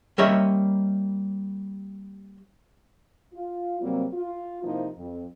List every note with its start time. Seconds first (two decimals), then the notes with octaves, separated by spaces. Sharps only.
0.18 G3 A#3 C#4 C#5 D#5 E5
3.33 F4
3.81 C3 F#3 G3 A#3 C4
4.14 F4
4.63 C3 F3 A#3 D#4 E4 C5
4.98 F2